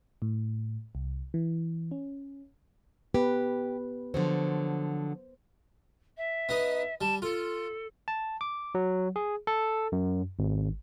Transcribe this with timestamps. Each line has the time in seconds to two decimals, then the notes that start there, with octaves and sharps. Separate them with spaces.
0.22 A2
0.95 C2
1.34 E3
1.91 C#4
3.14 B3 G4 B4
4.14 D3 F3 F#3 C5
6.17 E5
6.49 B3 D#4
7.01 G3 A5
7.22 F4 A4
8.08 A5
8.41 D6
8.75 F#3
9.16 G#4
9.47 A4
9.92 F#2
10.39 G#1